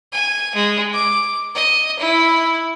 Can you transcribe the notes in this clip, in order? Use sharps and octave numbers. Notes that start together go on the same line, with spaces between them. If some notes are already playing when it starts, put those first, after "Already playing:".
G#5
G#3
D6
D#5
E4